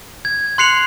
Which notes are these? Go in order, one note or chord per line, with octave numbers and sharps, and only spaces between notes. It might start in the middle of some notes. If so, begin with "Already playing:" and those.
G#6
C6 F#6 C7 C#7 F7 F#7